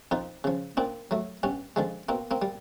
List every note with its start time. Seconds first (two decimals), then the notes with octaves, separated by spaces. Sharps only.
0.11 F2 D#4 F4
0.44 C#3 F3
0.77 A#2 C4 D4
1.11 F#3 A3
1.43 G2 B3 C#4
1.76 D3 F3 G#3
2.09 B2 A#3 C4
2.31 A#3 C4
2.42 G3